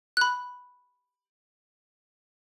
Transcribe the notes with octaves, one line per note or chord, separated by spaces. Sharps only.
B5 F#6